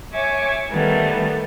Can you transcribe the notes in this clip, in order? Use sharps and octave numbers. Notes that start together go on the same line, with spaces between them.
C#5 E5 G#5 C#6 D6
D#3 G3 A3 B3